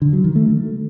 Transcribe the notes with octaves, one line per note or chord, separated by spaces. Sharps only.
D3
F#3
D#3
A3